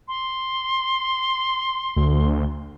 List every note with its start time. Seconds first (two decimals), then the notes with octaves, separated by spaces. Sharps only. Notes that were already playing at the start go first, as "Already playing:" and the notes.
0.08 C6
1.96 D2